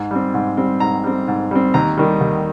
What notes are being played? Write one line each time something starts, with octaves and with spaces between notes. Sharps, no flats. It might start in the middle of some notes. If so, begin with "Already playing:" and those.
Already playing: G#2
G3 C4
G#2
G3 C4
G#2 A#5
G3 C4
G#2
G3 C4
D#2 A#5
D#3 G3
D#2